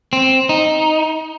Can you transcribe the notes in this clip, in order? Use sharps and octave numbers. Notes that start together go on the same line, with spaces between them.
C4
D#4